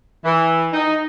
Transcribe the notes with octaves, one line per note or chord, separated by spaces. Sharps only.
E3
D#4